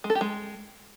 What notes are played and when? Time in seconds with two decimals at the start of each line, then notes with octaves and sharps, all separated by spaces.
0.04 G#3
0.10 A4
0.15 G4
0.21 G#3